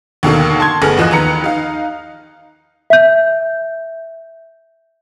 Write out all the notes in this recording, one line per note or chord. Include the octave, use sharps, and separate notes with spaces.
D#2 B2 D3 A#3
A5 C6 G#6
G1 A3 B3 G#4 F6
E2 F3 D#5 F#6
D#2 B4 A#5 C#7
D#4 F5
E5 G6